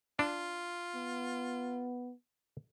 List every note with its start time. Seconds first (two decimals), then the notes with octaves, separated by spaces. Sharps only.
0.19 D4 F4
0.95 B3